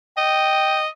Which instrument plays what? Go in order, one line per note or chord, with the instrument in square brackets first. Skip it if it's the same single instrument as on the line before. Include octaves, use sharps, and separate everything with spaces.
[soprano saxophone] D#5 [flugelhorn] G5